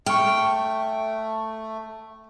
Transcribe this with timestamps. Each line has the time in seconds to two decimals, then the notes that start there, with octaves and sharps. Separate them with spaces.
0.06 A3 G5 C#6 F6